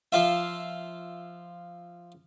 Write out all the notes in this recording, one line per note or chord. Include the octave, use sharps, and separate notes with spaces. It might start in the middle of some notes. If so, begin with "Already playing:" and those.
F3 F4 E5